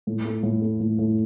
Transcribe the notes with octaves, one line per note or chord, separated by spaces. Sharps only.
A2
A3
A2
A3
A2
A2